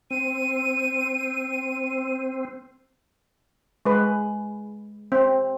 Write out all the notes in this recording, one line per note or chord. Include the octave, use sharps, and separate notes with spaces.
C4 D#7
G#3 B4
C4